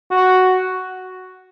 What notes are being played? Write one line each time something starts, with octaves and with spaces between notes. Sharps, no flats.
F#4